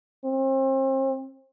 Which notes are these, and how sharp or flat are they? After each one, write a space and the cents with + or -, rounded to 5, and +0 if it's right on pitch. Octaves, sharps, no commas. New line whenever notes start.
C4 +35